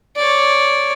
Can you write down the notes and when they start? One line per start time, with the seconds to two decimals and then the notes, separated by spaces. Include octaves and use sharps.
0.17 C#5 D5